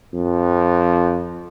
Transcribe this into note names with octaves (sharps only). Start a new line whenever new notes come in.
F2